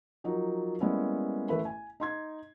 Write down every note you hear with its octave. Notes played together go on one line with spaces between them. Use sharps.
F3 F#3 D#4 F4 A#4
G3 G#3 A#3 B3 C#4 E4
A1 A3 B4 E5 B5
G#5
D#4 C6 G#6